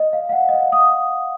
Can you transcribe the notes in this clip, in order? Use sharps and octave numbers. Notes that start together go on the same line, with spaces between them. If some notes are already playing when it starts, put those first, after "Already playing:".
Already playing: D#5
F5
F5
F#5
D#5
F5
D#6